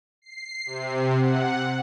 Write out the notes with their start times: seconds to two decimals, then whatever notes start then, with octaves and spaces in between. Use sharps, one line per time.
0.22 C7
0.66 C3
1.18 F#5